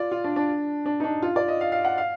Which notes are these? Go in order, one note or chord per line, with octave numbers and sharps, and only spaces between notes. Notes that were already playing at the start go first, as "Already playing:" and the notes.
Already playing: F4 D5
F4
D4
D4
D4
D#4
D4
F4
D5
D#5
F5
F5
F#5
F5